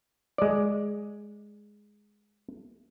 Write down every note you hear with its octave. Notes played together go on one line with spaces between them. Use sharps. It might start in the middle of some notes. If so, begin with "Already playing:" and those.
G#3 D5